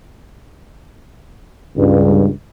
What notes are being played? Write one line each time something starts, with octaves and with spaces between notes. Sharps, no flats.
C#2 G2